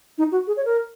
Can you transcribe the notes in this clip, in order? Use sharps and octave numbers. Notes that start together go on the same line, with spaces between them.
D#4
F#4
G#4
C#5
A#4